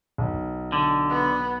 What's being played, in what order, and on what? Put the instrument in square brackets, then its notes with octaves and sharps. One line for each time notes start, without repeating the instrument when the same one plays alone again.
[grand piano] B1
[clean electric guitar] D3
[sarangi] B3